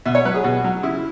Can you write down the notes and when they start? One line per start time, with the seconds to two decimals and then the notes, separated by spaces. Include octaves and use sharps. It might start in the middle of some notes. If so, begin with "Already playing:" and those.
0.06 B2 E5
0.15 C#5
0.25 F#3 B4
0.34 G#4
0.44 B2 F#4
0.64 F#3
0.83 C#3 E4